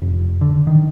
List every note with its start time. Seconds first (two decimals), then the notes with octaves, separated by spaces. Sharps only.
0.02 F1
0.41 D3
0.67 D#3